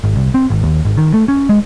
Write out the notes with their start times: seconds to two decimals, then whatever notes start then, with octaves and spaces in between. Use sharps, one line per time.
0.04 G#1
0.16 C2
0.34 C4
0.50 G#1
0.63 D#2
0.85 G#1
0.98 D#3
1.14 A3
1.28 C#4
1.49 G#3